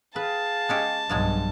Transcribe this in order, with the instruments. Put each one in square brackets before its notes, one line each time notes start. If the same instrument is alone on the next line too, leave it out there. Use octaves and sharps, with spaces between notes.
[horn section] G#4 F5 G5 [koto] B4 [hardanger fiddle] A5
[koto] G#3 C#4 G4
[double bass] B1 G2 [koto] F3 F#3 G#3